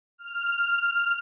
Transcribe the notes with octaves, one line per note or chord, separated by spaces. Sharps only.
F6